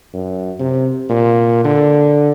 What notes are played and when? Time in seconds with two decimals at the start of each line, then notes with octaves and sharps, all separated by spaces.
0.14 F#2
0.59 C3
1.09 A#2
1.64 D3